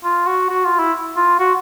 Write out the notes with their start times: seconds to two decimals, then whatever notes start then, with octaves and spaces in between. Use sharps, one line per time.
0.04 F4
0.27 F#4
0.49 F#4
0.65 F4
0.79 E4
1.16 F4
1.39 F#4